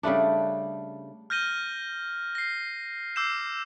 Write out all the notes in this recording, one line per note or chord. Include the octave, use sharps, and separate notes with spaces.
C#3 G3 A3 D4
F6 G6 A#6 D#7 G7
A#6 C7
D6 E6 G6 C7 E7